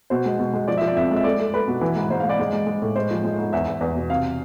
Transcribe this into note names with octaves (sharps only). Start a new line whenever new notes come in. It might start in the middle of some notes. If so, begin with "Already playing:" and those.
B2 C5
G#3
B2
G#3
F3 D5
E5
F3
D5
F2 E5
G#3
E5
A3 D5
A3
A3 B4
B2
E3
G#2
G#2 C5
F5
G#2
D5
G#3
G#3
G#3
A2
G#3 C5
F3
G#3
G#2
E2 E5
E2
E2
B2
C3 F5